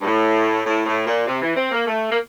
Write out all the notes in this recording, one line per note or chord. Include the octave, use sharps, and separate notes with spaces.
G2
A2
A2
A2
A#2
C3
E3
C4
A#3
A3
A#3